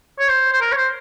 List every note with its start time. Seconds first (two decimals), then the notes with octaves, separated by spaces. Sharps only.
0.19 C#5
0.29 C5
0.53 C5
0.61 A#4
0.72 C#5
0.77 C5